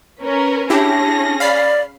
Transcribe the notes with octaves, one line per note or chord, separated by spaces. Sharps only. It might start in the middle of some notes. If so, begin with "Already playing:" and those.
C#4 A#4 B4
C#4 D4 E4 G4 G#4 A#6
D5 F5 B5 C7